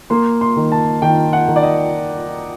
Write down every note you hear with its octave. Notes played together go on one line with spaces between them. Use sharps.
A#3 C6
C6
D#3
A5
D#3 G5
F#5
D#3
D5
D#5